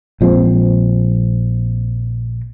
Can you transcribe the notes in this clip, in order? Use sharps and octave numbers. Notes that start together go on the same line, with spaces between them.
A#1 F3 G#3 C4